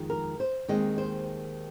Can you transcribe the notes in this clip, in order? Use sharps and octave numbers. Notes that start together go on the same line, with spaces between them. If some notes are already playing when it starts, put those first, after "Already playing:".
Already playing: F2 D#3 G#3
A#4
C5
D#2 D#3 G#3 C4 D#5
C5